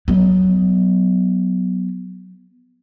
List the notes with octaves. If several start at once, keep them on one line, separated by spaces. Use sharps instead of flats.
F#3 B3